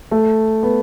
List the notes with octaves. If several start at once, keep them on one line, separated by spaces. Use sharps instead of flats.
A3
B3